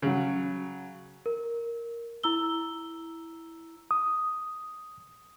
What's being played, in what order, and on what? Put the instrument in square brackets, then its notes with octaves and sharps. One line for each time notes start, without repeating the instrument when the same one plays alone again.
[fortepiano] C#3 F#3
[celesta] A#4
E4 A#5 E6 G7
[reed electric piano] D#6